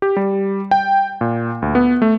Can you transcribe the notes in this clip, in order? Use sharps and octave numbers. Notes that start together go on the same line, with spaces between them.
G4
G3
G5
A#2
D2
B3
A3